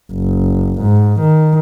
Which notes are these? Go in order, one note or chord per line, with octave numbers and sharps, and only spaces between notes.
F#1
G#2
D#3